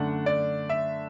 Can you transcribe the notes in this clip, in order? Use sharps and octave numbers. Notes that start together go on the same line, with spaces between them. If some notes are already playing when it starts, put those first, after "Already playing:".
Already playing: F#2 D3 A3 D4 F#5
D5
E5